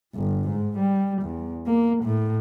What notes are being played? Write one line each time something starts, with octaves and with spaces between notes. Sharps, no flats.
G1
G#2
G3
E2
A#3
A2